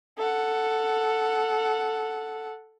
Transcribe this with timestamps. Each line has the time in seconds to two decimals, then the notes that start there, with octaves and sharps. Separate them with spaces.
0.18 A4 F#5